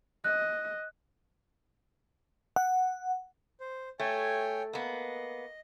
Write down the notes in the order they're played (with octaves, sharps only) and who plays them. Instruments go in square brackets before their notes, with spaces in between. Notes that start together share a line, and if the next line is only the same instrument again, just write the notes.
[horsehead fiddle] D#5 [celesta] F#6
[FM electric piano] F#5
[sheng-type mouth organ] C5
[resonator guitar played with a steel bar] A3 [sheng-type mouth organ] C#5 G5 G#5
[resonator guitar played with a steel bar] A#3 B3 [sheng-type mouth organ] D#5